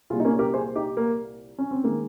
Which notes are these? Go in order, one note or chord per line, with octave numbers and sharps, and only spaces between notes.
C2 A#2 G3 F4 G#4
D#4
A#3 C#4
G4 A#4
G#4 C5
D#4 G4
A#3
C#4
C4
D#3 G#3 A#3